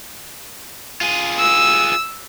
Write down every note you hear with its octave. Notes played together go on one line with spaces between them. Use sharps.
F4 G#4
E6